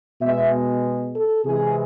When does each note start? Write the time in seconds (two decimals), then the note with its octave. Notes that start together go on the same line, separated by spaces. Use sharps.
0.21 B2 G#3 E5
1.14 A4
1.45 C3 E3 G#3 G#4